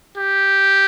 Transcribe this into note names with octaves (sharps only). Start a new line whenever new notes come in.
G4